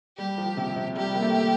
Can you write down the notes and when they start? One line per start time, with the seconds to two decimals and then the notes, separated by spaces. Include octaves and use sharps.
0.17 G3 G4
0.38 F3
0.57 C3
0.76 C3
0.96 G3 G4
1.14 A#3
1.22 A3